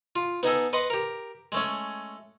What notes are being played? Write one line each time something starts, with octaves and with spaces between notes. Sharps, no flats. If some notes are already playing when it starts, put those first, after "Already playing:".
F4
B3 D#4 G#4 A4
B4 D#5 F#5 C6
G4 A#4
G#3 A3 C#4